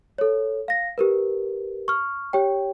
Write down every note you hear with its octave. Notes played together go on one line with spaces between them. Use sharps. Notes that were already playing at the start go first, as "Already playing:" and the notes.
A4 C#5
F5 A#6
G4 A#4 B4
C#6 F6
G4 C#5 G5